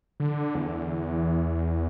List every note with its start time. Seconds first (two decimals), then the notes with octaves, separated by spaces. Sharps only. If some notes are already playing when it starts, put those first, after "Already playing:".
0.20 D3
0.55 E2